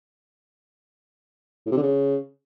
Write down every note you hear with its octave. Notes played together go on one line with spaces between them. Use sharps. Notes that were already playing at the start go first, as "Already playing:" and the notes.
A2
C3
D3
C#3